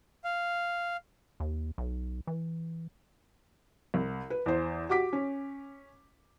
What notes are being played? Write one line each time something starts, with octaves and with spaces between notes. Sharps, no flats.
F5
D#2
B1
E3
C2
B4
E2 C5
F#4 G4 D6 B6
C#4